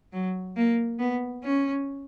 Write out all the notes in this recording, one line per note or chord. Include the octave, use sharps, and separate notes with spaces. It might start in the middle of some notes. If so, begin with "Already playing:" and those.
F#3
A#3
B3
C#4